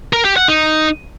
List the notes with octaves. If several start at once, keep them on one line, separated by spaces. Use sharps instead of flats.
A#4
G4
F#5
D#4